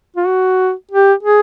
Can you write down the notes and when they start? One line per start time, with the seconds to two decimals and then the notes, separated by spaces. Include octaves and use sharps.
0.16 F4
0.27 F#4
0.91 G4
1.23 G#4